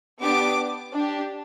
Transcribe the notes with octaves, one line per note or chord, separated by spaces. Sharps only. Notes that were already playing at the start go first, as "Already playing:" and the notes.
B3 D4 G4 D6
D4
G4